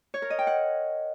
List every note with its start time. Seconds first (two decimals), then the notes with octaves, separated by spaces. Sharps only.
0.14 C#5
0.22 A#4
0.30 D#5
0.39 G5
0.47 F#5